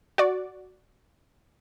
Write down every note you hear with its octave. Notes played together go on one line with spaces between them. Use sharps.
F#4 D5